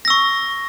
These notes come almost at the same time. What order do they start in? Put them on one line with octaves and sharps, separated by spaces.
A#6 E6 C#6